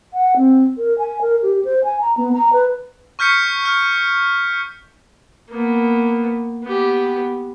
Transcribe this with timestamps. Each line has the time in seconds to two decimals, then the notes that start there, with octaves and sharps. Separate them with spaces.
0.14 F#5
0.37 C4
0.78 A#4
0.98 G#5
1.21 A#4
1.42 G4
1.65 C5
1.84 G#5
2.01 A#5
2.17 B3
2.33 A#5
2.53 B4
3.19 C#6 F6 G6 B6 C#7
3.65 F6
5.49 A#3 B3
6.63 B3 G4